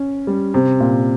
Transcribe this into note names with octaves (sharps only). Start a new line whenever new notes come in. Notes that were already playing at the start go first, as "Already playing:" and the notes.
Already playing: C#4
G3
C3
A#2